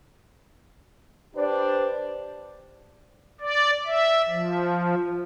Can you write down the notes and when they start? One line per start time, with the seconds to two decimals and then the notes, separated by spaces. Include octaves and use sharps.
1.35 D4 G4 B4 C5 D5
3.41 D5
3.86 E5
4.29 F3